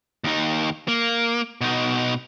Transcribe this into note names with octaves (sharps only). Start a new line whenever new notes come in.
D#2 D#4
A#3
B2 D#4